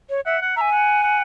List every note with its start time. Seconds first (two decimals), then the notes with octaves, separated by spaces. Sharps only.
0.10 C#5
0.26 E5 F#5
0.41 F#5
0.56 E5 G#5 A#5
0.71 F#5
1.03 F#5